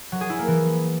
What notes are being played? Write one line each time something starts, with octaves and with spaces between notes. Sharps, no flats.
F#3
G#4
E4
A#3
E3